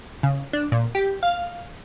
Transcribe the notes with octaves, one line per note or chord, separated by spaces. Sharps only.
C#3
D4
A#2
G4
F5